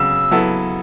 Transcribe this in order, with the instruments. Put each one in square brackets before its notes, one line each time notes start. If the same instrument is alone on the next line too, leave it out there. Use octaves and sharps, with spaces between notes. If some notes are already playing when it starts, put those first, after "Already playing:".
Already playing: [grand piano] C#3 F#3 B3 [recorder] E6
[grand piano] F#3 B3 E4 A4